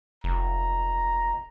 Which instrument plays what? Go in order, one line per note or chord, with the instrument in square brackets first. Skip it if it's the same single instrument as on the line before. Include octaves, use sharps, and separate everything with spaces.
[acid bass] F1 [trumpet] A#5